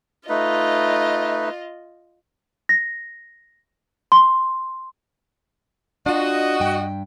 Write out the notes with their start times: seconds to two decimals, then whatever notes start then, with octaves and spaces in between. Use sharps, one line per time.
0.29 A3 D#4 F4 B4 D#5
2.69 A#6
4.12 C6
6.06 D4 F4 F#4 D#5
6.60 G2 G5